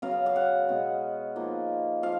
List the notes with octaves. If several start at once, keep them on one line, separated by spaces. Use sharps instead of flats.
C#3 F#3 B3 F5
F5
F#5
B2 G#3 C#4
F3 A#3 D#4
F3 F5